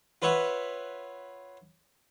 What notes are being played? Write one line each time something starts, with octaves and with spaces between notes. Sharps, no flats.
F4 B4 C#5 E5 F#5